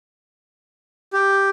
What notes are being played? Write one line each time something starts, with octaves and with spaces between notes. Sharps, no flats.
G4